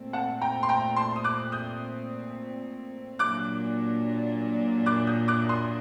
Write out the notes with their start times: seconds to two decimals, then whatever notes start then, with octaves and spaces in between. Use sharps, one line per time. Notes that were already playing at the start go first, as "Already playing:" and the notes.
Already playing: A#2 A3 C4
0.13 F#5 A5
0.41 G5 A#5
0.63 C6
0.69 G5 A#5
0.96 A5 C6
1.16 D#6
1.24 D6 F#6
1.52 D#6 G6
3.19 A#2 F#3 A#3 D4 D6 F#6
4.86 D6 F#6
5.07 D#6 G6
5.28 D6 F#6
5.49 C6 D#6